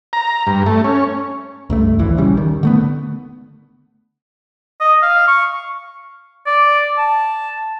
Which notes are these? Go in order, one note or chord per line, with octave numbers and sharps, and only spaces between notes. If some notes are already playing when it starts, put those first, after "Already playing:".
A#5
G2
A3
C#4
C#2 G2 A3
A#1 D#2 E3
C#3 G3
D#3
D3 A3 B3
D#5
F5
C#6
D5
A5